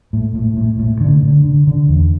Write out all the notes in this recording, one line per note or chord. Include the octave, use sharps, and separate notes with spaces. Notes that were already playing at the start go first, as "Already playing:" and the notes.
A2
A2
A2
A2
D3
D3
D3
D3
E2